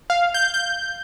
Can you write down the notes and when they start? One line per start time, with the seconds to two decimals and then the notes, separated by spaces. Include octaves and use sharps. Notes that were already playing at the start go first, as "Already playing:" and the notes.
0.10 F5
0.34 G6
0.54 G6